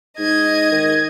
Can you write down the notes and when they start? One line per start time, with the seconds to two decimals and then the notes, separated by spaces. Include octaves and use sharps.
0.18 G#2 D#5 G#6
0.72 D#3